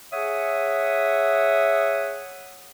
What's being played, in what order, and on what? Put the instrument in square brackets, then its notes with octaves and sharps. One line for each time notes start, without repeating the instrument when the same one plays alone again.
[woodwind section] G#4 C#5 E5 F#5 D#6